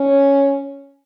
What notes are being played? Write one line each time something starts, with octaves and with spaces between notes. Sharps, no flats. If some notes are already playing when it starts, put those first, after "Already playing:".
Already playing: C#4